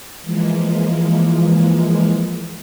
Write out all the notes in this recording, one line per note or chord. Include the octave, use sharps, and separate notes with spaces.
E3 F3 G#3 A#3